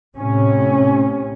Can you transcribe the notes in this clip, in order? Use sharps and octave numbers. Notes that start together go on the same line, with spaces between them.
A2 C3 C#4